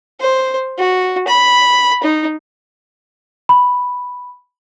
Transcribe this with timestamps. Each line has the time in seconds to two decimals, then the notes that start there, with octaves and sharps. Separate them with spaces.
0.20 C5
0.78 F#4
1.28 B5
2.03 D#4
3.49 B5